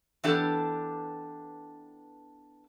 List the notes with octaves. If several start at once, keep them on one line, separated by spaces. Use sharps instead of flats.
E3 B3 D4 G4 A4